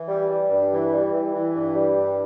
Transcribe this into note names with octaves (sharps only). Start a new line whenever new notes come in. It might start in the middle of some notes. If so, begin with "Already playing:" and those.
Already playing: E3
G3
G3
G2
E3
G3
E3
E3
G2
G3
G2